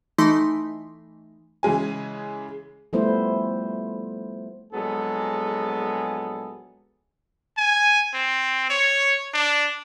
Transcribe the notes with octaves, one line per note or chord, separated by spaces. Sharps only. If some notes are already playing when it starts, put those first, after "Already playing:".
E3 A3 D#4 C6 B6
C#3 E3 G#3 G#5
F3 G3 A3 B3 E4 C5
A#1 F#3 G#3 B3 G#4 A4
G#5
C4
C#5
D4